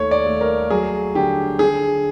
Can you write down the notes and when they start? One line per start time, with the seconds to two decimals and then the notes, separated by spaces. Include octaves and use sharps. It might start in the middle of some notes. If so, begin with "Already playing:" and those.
Already playing: D#2 A3 C#5
0.11 D5
0.27 A3
0.41 A#4
0.70 F#3 G#4
1.15 D3 G4
1.59 D3 G#4